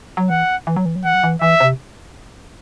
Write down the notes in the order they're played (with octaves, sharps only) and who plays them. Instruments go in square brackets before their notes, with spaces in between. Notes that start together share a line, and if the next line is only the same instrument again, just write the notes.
[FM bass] F#3
[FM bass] E3 [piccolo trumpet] F#5
[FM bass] E3
F#3
E3
F#3
[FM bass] E3 [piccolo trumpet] F#5
[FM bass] F#3
E3
[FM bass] E3 [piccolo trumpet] E5
[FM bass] C3